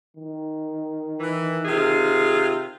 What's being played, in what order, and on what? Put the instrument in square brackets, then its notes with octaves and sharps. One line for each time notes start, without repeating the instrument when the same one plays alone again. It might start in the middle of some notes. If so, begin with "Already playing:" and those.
[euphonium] D#3
[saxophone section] E3
C3 F4 G#4